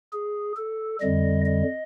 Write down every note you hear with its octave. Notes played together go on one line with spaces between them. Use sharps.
G#4
A4
F2 D3 G3 D#5
D#5